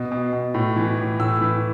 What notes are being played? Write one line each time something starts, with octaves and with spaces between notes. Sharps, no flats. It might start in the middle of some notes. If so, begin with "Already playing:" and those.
Already playing: B2
B2
B2
A2
E3
A2
A2 E6
E3